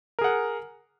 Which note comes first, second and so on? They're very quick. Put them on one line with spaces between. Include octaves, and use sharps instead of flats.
A#4 G#4 F#5